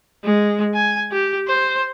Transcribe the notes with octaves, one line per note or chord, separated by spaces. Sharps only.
G#3
G#5
G4
C5